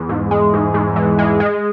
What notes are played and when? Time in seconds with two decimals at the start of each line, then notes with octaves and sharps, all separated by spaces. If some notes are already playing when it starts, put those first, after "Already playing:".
Already playing: E2
0.09 G#2
0.31 G#3
0.54 G#2
0.74 G#2
0.96 E3
1.19 G#3
1.40 G#3